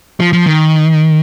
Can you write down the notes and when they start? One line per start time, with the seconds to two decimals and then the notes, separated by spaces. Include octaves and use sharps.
0.20 F3
0.33 F3
0.46 D#3